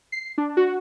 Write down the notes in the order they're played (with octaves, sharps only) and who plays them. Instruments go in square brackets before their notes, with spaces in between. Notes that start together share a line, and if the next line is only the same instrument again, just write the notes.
[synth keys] C7
D4
F#4